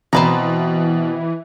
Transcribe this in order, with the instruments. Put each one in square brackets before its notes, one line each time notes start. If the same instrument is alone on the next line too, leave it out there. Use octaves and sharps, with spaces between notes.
[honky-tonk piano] B2 [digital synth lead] E3 [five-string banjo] C4 B4 A#5